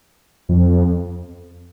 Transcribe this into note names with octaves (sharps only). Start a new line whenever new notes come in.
F2